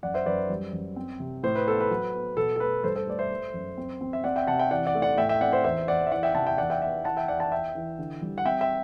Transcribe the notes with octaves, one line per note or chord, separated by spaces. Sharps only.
F#2 D5 F#5
C5 E5
F#2 B4 D5
G3
F#2
C4
C3
A2 C5
B4
B3 A4
B4
F#3
B3
B2 A4
A4
A3 B4
G2 A4 C5
A4 C5
A3 D5
C5 E5
A3
F#2
C4
C4
E5
C4 D5 F#5
E5 G5
C3 F#5 A5
E5 G5
E3 D5 F#5
D5 F#5
A3
D5 F#5
A2 E5 G5
E5 G5
C4 D5 F#5
C5 E5
E2 C5 E5
E2 D5 F#5
E5
E3 D5 F#5
E5 G5
C3 F#5 A5
E5 G5
E2 D5 F#5
E5 G5
B3 E5 G5
E3 F#5 A5
E5 G5
E2 D5 F#5
F#5 A5
E3 E5 G5
E3
D3
G3
F#5
C4 E5 G5
E5 G5